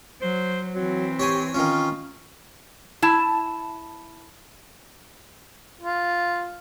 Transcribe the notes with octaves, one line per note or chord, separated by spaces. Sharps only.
F#3 C5
E3 F#3 C4
G4 C#5 G#5
D#3 C#4 F4
E4 A5
F4